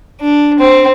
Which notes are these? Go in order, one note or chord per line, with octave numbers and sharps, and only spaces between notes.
D4
C4